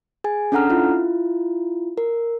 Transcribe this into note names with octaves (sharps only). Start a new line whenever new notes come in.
G#4 G#5
C#4 D4 A4 F#5 A#5 F6
E4 F4
A#4